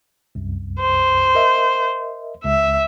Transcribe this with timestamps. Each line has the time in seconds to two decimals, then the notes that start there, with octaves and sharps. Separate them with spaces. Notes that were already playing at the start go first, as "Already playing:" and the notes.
0.35 C2 F#2
0.80 C5
1.35 A#4 D#5 E5
2.44 C#2 E5